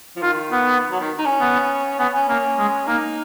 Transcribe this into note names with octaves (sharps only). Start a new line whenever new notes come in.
F3
D#3 F4
B3
F#3
D#3
D#4
C#4
B3
B3 C#4
C#4
A#3 C#4
G#3
A#3 D#4